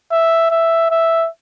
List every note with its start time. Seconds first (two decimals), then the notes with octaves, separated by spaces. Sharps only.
0.12 E5
0.51 E5
0.91 E5